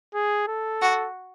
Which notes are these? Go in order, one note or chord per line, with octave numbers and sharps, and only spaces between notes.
G#4
A4
F#4